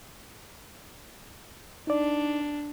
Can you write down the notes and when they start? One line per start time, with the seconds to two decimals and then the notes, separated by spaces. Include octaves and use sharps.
1.87 D4 D#4 D5